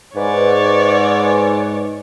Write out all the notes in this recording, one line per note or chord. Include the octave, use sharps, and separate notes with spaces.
G#2 B4 C#5 D5